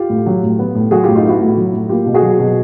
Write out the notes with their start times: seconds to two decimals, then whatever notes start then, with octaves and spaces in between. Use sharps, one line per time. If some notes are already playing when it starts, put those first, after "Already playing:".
Already playing: F4 G4
0.10 A2
0.26 F#3
0.43 A2
0.59 B3
0.75 A2
0.91 F#3 F#4 G#4
1.04 A2 F4 G4
1.16 D#4 F4
1.25 B3 E4 F#4
1.40 A2
1.57 F#3
1.73 A2
1.89 A#3 F4 G4
2.06 B2
2.14 F#4 G#4
2.22 F#3
2.39 B2